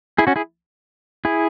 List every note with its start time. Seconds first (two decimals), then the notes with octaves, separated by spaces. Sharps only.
0.18 E4 G#4
0.27 C#4 F#4
0.36 E4 G#4
1.25 E4 G#4